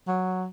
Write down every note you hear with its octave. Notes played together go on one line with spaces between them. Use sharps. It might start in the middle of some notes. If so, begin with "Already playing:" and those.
F#3